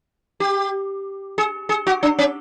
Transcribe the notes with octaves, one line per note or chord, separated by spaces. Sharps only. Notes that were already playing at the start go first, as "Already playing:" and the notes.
G4
G#4
G#4
F#4
D4
C#4